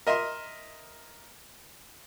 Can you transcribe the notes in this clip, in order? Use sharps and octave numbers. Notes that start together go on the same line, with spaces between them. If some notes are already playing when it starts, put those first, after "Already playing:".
A#4 D#5 E5 C6